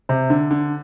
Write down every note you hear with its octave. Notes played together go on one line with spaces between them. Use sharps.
C3
D3
D3